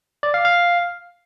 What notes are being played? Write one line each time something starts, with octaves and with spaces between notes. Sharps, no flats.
D5
F5
F5